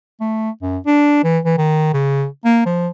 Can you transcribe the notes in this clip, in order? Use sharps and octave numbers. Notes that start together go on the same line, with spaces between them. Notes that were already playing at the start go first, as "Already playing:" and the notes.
A3
F#2
D4
E3
E3
D#3
C#3
A#3
F3